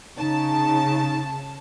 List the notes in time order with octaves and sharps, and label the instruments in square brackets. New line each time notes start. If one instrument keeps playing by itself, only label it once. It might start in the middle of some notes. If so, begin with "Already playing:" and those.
[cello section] C#3 [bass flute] D#4 [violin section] A5